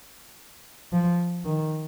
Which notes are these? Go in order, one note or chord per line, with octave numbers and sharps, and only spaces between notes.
F3
D#3